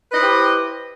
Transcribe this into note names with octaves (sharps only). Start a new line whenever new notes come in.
E4 G4 B4 C5 D#5